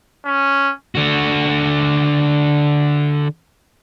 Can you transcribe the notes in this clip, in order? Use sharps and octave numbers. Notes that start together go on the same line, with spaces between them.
C#4
D3 F#4